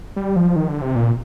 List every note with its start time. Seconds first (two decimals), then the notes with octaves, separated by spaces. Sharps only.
0.17 G3
0.36 F3
0.56 D#3
0.69 D3
0.82 C3
0.96 A#2